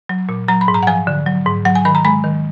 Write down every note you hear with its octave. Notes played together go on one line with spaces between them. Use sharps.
F#3
A#2
F#3 A#5
B5
G#2
A#5
F#5
F3 G#5
D3
F#3
G#2
F#3 F#5
G#5
D#3 B5
A#5
G#3 B5
D#3